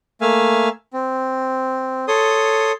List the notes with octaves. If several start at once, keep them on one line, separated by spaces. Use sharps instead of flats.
A3 A#3 E5 F5 G#5
C4
A4 C#5 C6 D#6